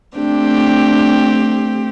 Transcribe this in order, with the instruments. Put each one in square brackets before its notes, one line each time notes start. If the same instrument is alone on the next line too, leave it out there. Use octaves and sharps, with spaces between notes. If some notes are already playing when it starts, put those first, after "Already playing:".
[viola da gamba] A3 C4 G4 [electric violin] D4